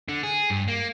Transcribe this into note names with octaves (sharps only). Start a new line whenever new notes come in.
D3
G#4
G2
A#3